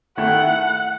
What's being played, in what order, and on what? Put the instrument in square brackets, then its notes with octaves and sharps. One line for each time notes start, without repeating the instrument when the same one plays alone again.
[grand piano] D#3 A3 E4 [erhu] F#5